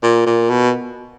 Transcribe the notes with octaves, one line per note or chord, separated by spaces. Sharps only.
A#2
A#2
B2